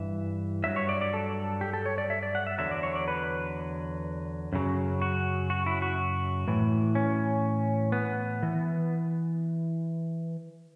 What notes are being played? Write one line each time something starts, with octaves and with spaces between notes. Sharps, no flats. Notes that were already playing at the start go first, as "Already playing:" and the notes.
Already playing: G2 E3 E5
G2 F#3 E5
C#5
D5
D5
A4
G4
A4
C#5
D5
E5
D5
F#5
E5
E2 D3 F#3 E5
D5
C#5
D5
B4
F#2 C#3 F#3
F#4
F#4
E4
F#4
A2 E3
C#4
B3
E3